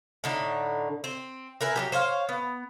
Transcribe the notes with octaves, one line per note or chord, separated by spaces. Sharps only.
A2 D3 D#4
C4
A#4 B4 E5 G#5
F#3 G3 G4
C5 C#5 E5 F5
B3